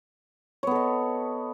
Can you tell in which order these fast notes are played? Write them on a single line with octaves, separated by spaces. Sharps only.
C#5 B3 A4 D#5